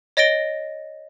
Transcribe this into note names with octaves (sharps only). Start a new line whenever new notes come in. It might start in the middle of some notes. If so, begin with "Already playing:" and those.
C#5 D#5 A6 A#6 D7 G7